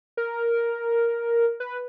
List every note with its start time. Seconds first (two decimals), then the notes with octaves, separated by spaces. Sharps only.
0.17 A#4
1.60 B4